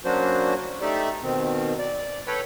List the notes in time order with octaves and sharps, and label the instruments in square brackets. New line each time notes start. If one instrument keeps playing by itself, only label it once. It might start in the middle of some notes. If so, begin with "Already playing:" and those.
[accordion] F#3 A#3 C#4 D4 F#4 C5
A3 D#4 G4 D5 E5
B2 D#3 C4
D5
A4 B4 C#5 F#5 G5 B5